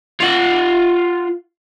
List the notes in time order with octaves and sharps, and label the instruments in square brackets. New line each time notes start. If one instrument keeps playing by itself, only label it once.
[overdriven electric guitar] F4 F#5